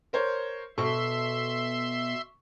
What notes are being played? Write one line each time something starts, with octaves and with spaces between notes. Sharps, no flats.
A#4 C5 C#5
B2 A4 E5 C6 C#6